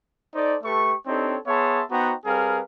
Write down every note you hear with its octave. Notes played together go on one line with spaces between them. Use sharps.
D#4 A4 C5 D5
A3 G4 A4 B4 C#6
C4 D4 D#4 G4 A4 C#5
B3 G#4 C#5 E5 A5 C6
B3 D#4 F#4 C5 G5 A#5
G3 C4 G#4 A#4 B4 F5